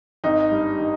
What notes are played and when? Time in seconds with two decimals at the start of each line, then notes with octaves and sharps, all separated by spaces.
0.24 G#1 D#4
0.51 G2
0.80 D#3